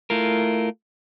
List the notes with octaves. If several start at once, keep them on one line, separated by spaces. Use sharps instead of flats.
A3 E4 F4 A#4